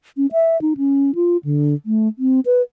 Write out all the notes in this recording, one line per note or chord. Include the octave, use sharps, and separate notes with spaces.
C#4
E5
D#4
C#4
F4
D3
A3
C4
B4